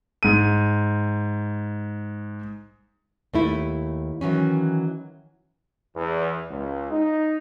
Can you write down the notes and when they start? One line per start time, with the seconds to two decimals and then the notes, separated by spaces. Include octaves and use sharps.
0.23 G#2 D#7
3.34 D#2 A3 E4
4.21 D#3 E3 F#3 C#4
5.95 E2
6.50 C#2
6.90 D#4